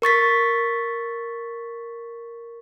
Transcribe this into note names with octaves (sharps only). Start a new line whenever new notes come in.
A#4 C#6 A6 B6